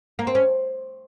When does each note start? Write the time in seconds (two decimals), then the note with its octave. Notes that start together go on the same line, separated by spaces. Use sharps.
0.19 A#3
0.27 C4
0.35 C#4